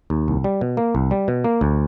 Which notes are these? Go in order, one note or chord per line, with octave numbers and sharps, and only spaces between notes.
D#2
C2
G3
B2
A#3
C2
G3
B2
A#3
D2